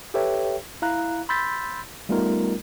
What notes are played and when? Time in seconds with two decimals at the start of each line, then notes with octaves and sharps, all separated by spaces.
0.14 G4 A4 B4 C#5 E5 G5
0.82 E4 F5 A#5 F#6
1.29 B5 C6 E6 G6 A6 B6
2.09 G3 A3 B3 D#4 F4 A#4